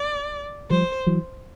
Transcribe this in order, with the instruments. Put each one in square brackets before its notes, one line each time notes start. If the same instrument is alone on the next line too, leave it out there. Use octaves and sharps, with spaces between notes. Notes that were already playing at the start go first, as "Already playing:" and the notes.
Already playing: [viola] D5
[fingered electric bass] F3 G3 [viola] C5
[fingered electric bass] E3 F#3